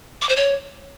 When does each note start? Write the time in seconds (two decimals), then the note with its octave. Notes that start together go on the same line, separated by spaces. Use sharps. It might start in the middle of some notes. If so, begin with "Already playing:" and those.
0.22 D6
0.29 C5
0.36 C#5